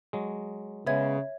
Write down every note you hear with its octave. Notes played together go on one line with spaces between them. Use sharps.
F#3 G#3
C#3 G#3 B3 C#5 E5 G#6